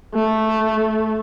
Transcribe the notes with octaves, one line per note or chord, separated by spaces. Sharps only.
A3